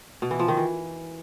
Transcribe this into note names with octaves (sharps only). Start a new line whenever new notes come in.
B2
E3
F3
D#3
E3